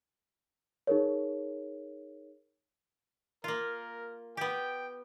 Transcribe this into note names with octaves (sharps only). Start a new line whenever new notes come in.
D#4 G#4 A#4 C#5
A#3 F4 A#4
B3 G4 G5